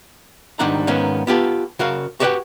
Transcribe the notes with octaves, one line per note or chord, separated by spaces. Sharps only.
G#2 D#3 G3 D4 F#5 A#5
G#2 D#3 A#3 B3 C#4
B3 F4 G4 A4
C#3 F#4 A#4 F5
F#4 G4 B4 D5 F#5 G5